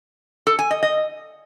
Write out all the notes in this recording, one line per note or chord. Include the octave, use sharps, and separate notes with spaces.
A4
G#5
D#5
D#5